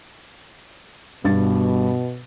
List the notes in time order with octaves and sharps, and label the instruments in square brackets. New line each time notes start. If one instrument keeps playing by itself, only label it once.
[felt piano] G2 A6 [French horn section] B2